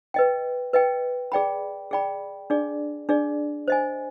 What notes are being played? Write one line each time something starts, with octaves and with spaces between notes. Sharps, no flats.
B4 D#5 G5
B4 D#5 G5
G#4 D5 G5 B5
G#4 D5 G5 B5
D4 G#4 D5
D4 G#4 D5
C5 D#5 G#5